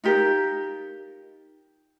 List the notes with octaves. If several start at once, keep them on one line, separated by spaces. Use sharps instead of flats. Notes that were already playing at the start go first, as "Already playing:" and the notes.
D#4 F4 G4 A#4